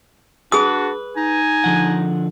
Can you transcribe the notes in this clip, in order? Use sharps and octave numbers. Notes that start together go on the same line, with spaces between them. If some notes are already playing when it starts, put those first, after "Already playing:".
D4 F#4 G#4 B4 D#6
D#4 G#5
D3 F3 F#5